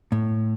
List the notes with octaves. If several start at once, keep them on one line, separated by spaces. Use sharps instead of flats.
A2